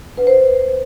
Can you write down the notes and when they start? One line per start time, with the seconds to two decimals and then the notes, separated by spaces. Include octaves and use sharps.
0.17 D2 B4
0.27 C5